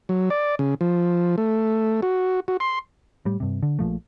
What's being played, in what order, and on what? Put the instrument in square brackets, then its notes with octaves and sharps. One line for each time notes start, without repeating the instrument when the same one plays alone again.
[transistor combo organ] F#3
D5
C#3
F3
A3
F#4
F#4
C6
[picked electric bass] A2 G3
G2 C3
D3
A#1 A#2 F3 A3